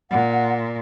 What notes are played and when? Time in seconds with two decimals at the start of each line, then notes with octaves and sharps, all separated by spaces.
0.11 A#2 F#5